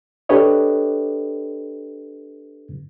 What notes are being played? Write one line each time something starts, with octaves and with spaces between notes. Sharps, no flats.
D4 G4 A4 B4 C#5 D#5